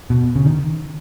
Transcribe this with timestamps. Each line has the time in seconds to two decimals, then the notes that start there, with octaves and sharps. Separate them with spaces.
0.10 B2
0.36 C#3
0.46 D#3